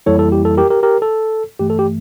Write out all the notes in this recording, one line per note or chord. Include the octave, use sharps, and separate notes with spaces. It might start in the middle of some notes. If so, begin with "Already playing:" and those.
F2 E3 G3 A#3 E4 A4 C#5
A4
G4
A4
G4 A#4
G4 A#4
G4 A#4
A4
G2 E3 A3 G4
A4
G4